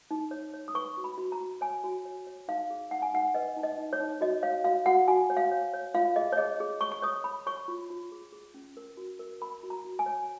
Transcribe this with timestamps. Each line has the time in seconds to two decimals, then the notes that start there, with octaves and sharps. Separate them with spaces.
0.11 D#4
0.31 C#5
0.54 C#5
0.68 D#6
0.74 B4 C#6
0.97 F#4
1.04 B5
1.18 F#4
1.32 A#5
1.41 F#4
1.61 C#5 G#5
1.84 F#4
2.05 C#5
2.27 C#5
2.48 D#4 F5
2.70 G#4
2.91 D#4 F#5
3.02 G#5
3.14 D#4 F#5
3.35 B4 D#5
3.57 D#4
3.63 D#5
3.78 D#4
3.93 C#5
4.00 D#4
4.21 F#4 D#5
4.43 C#5 F5
4.64 F#4 F5
4.86 F#4 F#5
5.08 F#4 G#5
5.30 C#5
5.37 F5
5.51 C#5
5.74 C#5
5.95 F4 F5
6.16 G#4 D#5
6.32 C#5
6.38 G#4 D#5
6.60 G#4
6.81 C#5 C#6
6.92 C#6
7.02 C#5 D#6
7.24 C#5 B5
7.47 C#5 C#6
7.68 F4
7.90 F4
8.12 G#4
8.32 G#4
8.54 C#4
8.77 A#4
8.97 F#4
9.19 A#4
9.41 A#4 B5
9.63 F#4
9.70 A#5
9.85 F#4
9.99 G#5
10.06 C#5